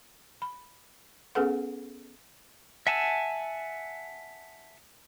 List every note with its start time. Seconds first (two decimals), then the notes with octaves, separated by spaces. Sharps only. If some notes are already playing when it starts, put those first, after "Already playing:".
0.42 B5
1.35 B3 C#4 G#4 A4 B4 F#5
2.87 E5 F#5 G#5 A5 E6